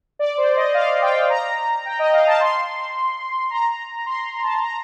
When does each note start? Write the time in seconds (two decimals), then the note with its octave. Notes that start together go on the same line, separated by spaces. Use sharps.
0.19 D5
0.37 C5
0.56 D#5
0.74 F5
1.02 G5
1.29 A#5
1.85 G5
1.99 D#5
2.13 F5
2.27 A5
2.40 C6
3.50 A#5
4.06 C6
4.43 A5
4.62 A#5